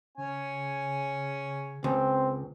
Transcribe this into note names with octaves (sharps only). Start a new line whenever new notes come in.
C#3 C#4 C#5 G#5
C#2 C4